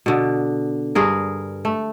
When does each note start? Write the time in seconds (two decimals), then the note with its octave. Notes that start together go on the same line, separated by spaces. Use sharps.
0.06 B2 D3
0.95 G2 G#4 A#4
1.65 A3